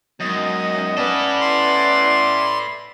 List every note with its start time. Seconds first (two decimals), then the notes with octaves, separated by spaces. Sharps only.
0.20 F#2 D#3 G#3 B3 D#5
0.98 B3 C#4 E4 A4 B4 D5
1.41 C6